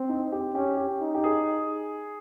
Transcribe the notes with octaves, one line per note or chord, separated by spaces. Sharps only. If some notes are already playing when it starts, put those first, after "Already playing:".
Already playing: C4
D#4
G4
C#4 G4
G4
D#4
G4
G#4